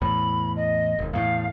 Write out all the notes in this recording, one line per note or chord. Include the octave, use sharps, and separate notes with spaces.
E2 A2 B5
D#5
E1 D#2
E2 A2 A3 F5